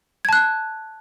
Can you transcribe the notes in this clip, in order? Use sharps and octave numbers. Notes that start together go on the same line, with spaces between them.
A5 F#6 G#6